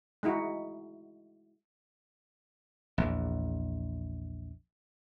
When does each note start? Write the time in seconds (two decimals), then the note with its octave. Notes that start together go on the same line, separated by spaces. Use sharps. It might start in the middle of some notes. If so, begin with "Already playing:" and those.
0.23 G#3 D#4 E4 F#4
2.98 A#1 E2